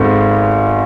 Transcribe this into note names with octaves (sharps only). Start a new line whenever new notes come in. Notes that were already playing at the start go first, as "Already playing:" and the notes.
Already playing: G#1 G#2 A4